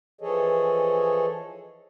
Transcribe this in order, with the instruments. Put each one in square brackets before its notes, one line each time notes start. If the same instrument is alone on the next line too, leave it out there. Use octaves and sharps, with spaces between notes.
[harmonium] E3 F3 G#4 A4 C#5 D#5